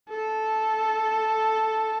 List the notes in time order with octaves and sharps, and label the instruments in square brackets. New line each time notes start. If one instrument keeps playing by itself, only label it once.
[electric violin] A4